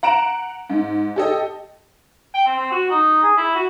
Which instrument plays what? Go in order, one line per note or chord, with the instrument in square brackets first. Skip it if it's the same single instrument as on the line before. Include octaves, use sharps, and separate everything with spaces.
[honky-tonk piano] F#5 A#5 D7 E7
G#2
G4 A4 D#5
[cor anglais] G5
C4
C4
F#4
D#4
G#4
E4
F#4